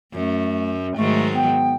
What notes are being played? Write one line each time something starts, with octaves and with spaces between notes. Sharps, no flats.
F#2 A3
G#2 D#3 F#3 A3
B3 G5